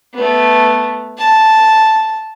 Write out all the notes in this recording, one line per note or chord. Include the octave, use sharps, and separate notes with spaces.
A3 B3
A5